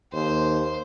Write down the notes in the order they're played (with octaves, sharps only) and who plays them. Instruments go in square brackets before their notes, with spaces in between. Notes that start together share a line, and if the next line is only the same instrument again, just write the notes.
[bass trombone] D#2 [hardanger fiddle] C5